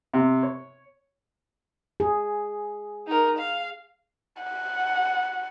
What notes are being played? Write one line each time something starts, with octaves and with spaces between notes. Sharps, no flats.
C3
C#5
G#4
D#4 A#4
F5
F#5